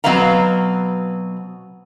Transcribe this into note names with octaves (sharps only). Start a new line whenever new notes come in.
B2 F#3 C4 B4 F5 A#5